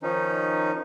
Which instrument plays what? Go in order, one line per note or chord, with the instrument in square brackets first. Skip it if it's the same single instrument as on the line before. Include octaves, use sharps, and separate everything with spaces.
[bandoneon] D#3 F3 C#4 D#4